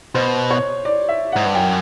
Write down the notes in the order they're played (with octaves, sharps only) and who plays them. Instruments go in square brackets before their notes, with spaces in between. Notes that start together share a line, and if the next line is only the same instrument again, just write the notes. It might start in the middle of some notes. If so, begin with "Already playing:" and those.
[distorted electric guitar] B2 [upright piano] C5
[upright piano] C#5
D5
E5
[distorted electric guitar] G#2 [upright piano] F#5
[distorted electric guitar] G2
[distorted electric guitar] F#2 [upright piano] G5